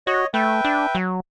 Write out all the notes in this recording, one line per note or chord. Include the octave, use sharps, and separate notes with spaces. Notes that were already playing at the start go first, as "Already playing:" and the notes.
F#4 C#5 D#5
A3 B4 E5 G5
D4
F#3